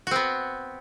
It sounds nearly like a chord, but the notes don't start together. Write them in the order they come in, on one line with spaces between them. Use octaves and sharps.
F#4 C4 B3